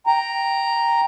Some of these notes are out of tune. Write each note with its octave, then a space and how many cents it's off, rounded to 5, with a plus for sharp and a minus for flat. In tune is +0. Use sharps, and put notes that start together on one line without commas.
G5 +0 A#5 +0